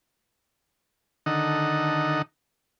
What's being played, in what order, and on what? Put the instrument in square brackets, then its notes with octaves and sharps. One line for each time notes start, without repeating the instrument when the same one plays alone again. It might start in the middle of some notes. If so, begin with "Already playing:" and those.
[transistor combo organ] D3 D#3 D#4 A4 D#5 F#5